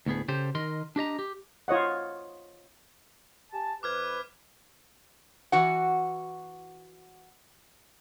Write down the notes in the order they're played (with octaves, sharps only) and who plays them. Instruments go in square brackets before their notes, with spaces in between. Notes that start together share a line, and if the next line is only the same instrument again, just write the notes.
[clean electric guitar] D2 A2 B3 G#4
C#3 G4 A4 C5
D#3 A#4 D#5 C6
D4 G4 D#5 A#5
G4
[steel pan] F4 C#5 D#5 F#5
[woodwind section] G4 G#5 A5
[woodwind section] F2 B4 [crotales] D6 F6 G#6
[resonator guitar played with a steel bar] E3 F#4 F#5